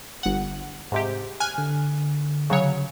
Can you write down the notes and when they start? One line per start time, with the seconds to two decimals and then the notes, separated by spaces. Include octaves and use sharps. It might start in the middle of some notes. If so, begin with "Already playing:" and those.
0.23 G1 F#5
0.92 G#2 C3 G4
1.40 G#5 F6 F#6
1.58 D3
2.50 C#3 F#3 C#5